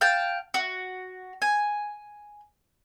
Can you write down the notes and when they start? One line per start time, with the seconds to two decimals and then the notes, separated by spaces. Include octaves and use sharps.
0.01 F5 G5 A5
0.54 F#4
1.42 G#5